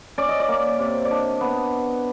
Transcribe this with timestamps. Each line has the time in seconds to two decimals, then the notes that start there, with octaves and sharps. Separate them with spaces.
0.18 C#4 D5
0.29 D#5
0.40 D5
0.49 A#3
0.79 C3
1.05 D5
1.10 D4 D#5
1.41 B3